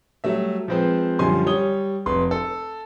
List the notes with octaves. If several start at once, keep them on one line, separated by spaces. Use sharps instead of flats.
F#3 G3 A3 E5
F3 G#3 C4 B4 C5
F#2 D3 F3 G3 G#5 C6
G3 C#5 D#6 G7
F1 B4 C6
A4